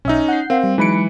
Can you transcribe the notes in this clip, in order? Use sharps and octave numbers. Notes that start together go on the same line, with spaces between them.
B1 C#4 D#4 E5
F#5 G6 C7
C4 A#4 F5
G3
E3 F#3 G#3 D#4 B4 B5 C#7 D7